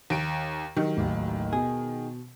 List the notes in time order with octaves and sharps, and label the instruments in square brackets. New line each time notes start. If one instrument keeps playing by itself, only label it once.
[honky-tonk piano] D#2 D7
[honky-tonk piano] D#3 [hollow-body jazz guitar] F#3 [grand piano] G4 A#4
[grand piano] A1 D#2
[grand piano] B2 [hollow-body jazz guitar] G#4